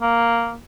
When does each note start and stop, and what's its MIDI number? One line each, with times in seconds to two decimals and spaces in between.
0.01 0.56 58